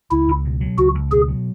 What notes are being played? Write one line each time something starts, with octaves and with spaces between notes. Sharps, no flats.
C#2 E4
C#2
B2
F#3
C#2 F#4
C#2
B2 G#4
F#3